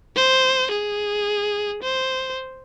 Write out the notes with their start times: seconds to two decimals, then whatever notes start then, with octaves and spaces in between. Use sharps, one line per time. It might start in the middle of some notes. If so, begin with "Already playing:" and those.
0.16 C5
0.71 G#4
1.83 C5